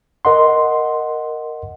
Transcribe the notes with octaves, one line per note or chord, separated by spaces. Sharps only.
A#4 D#5 F#5 C6